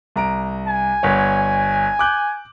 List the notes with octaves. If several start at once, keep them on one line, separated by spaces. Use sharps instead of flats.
C2 A#5 D7
G#5
G1 C#5
D6 F#6 G6